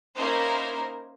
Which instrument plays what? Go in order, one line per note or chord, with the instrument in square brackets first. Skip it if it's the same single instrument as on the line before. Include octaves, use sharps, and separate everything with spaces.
[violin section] A#3 C#4 D#4 E4 A#4 C5